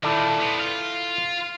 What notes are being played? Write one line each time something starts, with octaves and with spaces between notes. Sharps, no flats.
A#2 D#3 E4 A4 D5
B3 C4
F4